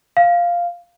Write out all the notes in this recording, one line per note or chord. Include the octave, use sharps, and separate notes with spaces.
F5